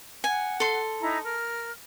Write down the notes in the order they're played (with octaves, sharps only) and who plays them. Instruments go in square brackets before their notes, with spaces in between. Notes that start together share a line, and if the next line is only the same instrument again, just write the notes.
[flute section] F#5 [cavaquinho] G#5
[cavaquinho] A4 C6
[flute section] D#4 E4 A#5
A#4 F6